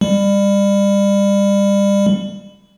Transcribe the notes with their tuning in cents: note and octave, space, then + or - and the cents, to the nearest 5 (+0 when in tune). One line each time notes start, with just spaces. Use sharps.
G3 +30